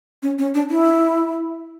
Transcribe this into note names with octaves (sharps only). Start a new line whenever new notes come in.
C#4
C#4
D4
E4